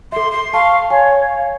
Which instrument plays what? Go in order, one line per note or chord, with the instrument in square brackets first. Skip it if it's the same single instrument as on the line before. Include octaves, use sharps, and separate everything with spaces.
[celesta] A4 E5 [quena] C6
[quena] C6
[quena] F5 [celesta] A5 [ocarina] C#6
[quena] C#5 [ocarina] F5 [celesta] G#5